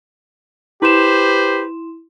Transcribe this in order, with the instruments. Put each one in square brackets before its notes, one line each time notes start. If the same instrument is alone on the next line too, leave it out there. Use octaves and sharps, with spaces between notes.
[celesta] E4 C6 E7 [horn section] G4 B4 C5